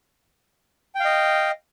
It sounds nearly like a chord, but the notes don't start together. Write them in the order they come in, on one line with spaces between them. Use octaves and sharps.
G5 F5 D#5